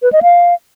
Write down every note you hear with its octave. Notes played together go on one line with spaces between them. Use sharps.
B4
D#5
F5